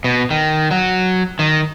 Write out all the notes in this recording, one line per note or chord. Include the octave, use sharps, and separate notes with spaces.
B2
D#3
F#3
D#3